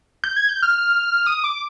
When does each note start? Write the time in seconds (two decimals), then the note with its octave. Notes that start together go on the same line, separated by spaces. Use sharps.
0.24 G6
0.36 G#6
0.49 G6
0.62 F6
1.26 D#6
1.44 D6